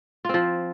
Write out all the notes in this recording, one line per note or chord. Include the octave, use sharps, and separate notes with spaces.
F3 C4 F4